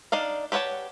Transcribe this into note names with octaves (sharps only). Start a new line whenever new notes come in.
D4 D#4 D5 F5
G4 B4 C#5 F#5 A5